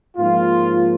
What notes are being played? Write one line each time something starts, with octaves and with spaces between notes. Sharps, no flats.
G#2 F3 A#3 F4